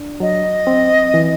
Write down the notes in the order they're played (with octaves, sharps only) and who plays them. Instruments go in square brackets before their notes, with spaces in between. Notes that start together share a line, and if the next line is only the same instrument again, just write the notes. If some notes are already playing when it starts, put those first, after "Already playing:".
Already playing: [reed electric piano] D4
[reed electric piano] F#3 [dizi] D#5
[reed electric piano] C4
E3